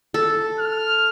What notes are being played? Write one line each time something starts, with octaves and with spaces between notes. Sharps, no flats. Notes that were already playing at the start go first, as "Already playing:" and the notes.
A4
F6